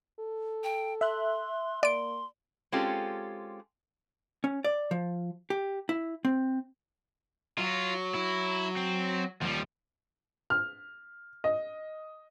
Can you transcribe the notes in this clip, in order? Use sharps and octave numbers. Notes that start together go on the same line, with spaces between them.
A4
G5
E5 C6 F#6
A#3 D5 C6 D7
G#3 C4 C#4 F4 G4 A4
C#4
D5
F3
G4
E4
C4
F#3 F4
E4
C4
D#2 F3 G3
F6
D#5